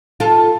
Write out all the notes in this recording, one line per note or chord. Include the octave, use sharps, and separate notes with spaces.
F4 A4